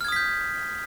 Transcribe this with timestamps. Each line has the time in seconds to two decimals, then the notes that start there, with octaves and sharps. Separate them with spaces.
0.01 F6
0.05 G#6
0.08 D#6
0.12 B6
0.16 G6